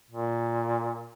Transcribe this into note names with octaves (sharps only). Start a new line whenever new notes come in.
A#2